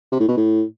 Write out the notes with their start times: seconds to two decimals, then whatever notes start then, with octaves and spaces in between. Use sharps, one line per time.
0.12 C3
0.20 A2
0.29 B2
0.37 A2